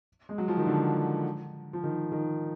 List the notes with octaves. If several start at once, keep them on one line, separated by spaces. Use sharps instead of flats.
G#3
F#3
F3
D#3
D3
F3
D#3
D#3